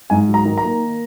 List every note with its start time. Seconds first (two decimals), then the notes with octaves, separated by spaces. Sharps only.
0.10 G#2 G#5
0.28 F#3
0.34 A#5
0.45 D#3
0.57 A#5
0.64 A#3